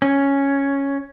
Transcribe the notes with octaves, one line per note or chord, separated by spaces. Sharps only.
C#4